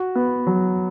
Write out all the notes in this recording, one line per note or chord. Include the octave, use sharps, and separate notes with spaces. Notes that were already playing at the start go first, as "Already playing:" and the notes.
Already playing: F#4
B3
F#3